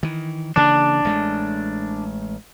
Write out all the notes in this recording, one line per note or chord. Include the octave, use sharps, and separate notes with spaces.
D#3 E3
C#3 E3 A#3 D4
A1 G#3 A3